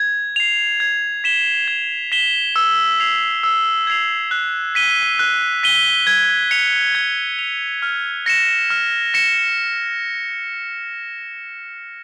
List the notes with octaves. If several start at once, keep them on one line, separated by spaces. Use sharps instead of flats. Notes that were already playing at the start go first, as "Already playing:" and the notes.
Already playing: G#6
C7 F7
G#6
B6 E7 G7
G#6
B6 E7 G7
E6
G#6 C7 F7
E6
G#6 C7 F7
F#6
B6 D#7 G7
F#6
B6 D#7 G7
G#6
C#7 F7
G#6
C#7 F7
F6
A#6 C#7 E7
F6
A#6 C#7 E7